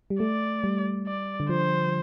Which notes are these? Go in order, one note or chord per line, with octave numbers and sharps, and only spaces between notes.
G3
A3 D5
G3
D5
D3
F3 C5